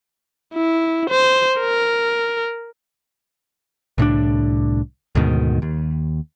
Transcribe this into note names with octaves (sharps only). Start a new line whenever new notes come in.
E4
C5
A#4
C2 A2 D3 D4
D2 G#2 B2 D#3
D#2